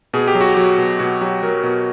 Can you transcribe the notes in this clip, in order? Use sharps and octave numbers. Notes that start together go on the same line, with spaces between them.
B2 G#4
G4
F#3
F#4
F#3 G4
B2
B2 F#4
F#3 G4
F#3 A#4
B2